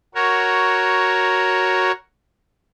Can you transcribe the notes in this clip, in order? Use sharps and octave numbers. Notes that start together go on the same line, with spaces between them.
F#4 A#4 C#5